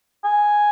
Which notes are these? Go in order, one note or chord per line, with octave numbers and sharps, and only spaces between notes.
G#5